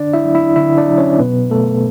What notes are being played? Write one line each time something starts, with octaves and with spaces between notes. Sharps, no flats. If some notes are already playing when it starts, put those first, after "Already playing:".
Already playing: D3 D4 D5
E4 E5
F#3
E4 E5
D3 E4 E5
D4 D5
F#3
C#4 C#5
B2 B3 B4
B2 A3 A4